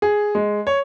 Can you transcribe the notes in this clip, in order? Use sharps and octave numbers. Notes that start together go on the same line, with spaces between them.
G#4
G#3
C#5